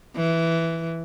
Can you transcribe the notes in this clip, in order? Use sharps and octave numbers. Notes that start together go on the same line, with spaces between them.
E3